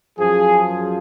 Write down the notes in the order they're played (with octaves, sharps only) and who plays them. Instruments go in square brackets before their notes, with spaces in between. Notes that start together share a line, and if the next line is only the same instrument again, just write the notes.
[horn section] F#2 F3 G#4